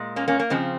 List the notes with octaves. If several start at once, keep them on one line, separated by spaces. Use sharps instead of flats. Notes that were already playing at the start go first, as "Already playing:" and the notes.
Already playing: A#2 G#3
A#3 C#4
A#3 C#4
A#3
C#3 F3 G#3 C4